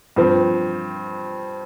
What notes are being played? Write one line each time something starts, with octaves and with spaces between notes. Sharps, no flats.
G2 F3 C4